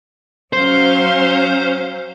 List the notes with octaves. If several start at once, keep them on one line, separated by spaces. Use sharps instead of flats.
F#3 C#4 C5 F5